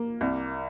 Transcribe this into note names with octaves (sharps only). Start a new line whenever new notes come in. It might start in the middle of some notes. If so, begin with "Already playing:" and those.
Already playing: A#3
C2